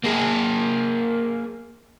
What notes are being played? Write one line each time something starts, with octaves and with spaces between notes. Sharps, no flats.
A#3 G#4